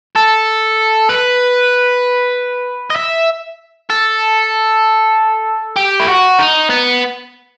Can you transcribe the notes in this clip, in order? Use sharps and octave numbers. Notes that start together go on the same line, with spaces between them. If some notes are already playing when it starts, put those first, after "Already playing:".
A4
B4
D#5
E5
A4
G4
E4
F#4
D#4
B3